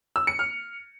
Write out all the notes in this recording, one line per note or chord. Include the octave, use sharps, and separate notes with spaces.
E6
C#7
F6